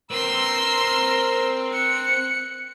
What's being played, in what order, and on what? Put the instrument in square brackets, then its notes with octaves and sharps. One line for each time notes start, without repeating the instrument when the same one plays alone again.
[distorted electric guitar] C4 B4 [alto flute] A#4 [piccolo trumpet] A#5 [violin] C6 E6
[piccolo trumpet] F#6 [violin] C#7